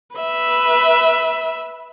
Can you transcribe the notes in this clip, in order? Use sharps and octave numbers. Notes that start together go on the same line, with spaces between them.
B4 E5